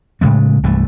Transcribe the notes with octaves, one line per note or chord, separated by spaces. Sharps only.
A2 C#3 G#3 A3
C2 G2 E3 A3